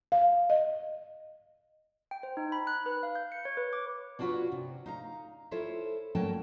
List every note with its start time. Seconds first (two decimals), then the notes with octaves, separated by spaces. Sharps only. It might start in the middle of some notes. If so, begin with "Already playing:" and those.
0.12 F5
0.50 D#5
2.11 G5
2.23 C5
2.37 D#4
2.52 B5
2.67 F#6
2.86 B4
3.03 F5
3.15 G6
3.32 C#7
3.45 C#5
3.57 B4
3.73 D6
4.19 D4 F4 F#4 A4 B4 C#5
4.52 C3
4.86 D#4 F5 A#5
5.51 E4 F4 A4 C5 C#5 E5
6.15 F#3 A3 A#3 C#4 G5 A5